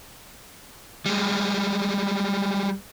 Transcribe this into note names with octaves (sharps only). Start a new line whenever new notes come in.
G3 G#3